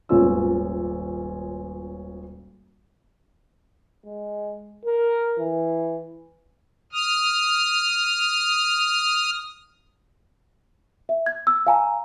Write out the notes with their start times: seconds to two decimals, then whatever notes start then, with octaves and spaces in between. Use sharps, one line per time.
0.09 D#1 G#1 B3 C#4 F4 E6
4.05 G#3
4.85 A#4
5.38 E3
6.92 D#6 F6
11.09 E5
11.26 G#6
11.47 E6
11.67 F5 G#5 A#5